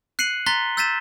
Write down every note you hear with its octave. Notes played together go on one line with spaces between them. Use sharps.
F#6 C7 C#7 D#7 F#7
A#5 C6 F#6 A6 B6 G7
E6 G6 A6 B6 D#7 E7